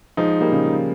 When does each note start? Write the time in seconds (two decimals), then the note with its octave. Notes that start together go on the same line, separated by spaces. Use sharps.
0.17 F3 G#3 D#4
0.41 G3 A#3
0.52 C#3